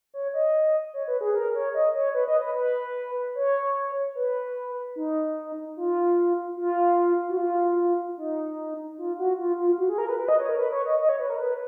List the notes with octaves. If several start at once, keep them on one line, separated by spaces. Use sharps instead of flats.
C#5
D#5
C#5
B4
G#4
A#4
C#5
D#5
C#5
B4
D#5
B4
B4
C#5
B4
D#4
F4
F4
F#4
F4
D#4
F4
F#4
F4
F4
F#4
G#4
A#4
B4
B4
D#5
C#5
A#4
B4
C#5
D#5
D#5
C#5
B4
A#4
B4